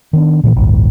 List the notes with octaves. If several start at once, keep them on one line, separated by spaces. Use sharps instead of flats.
D#3 B3 D4
A#2 C#3 E3
A1 D2 G2